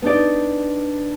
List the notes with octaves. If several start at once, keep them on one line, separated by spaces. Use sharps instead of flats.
B3 D4 D#4 D5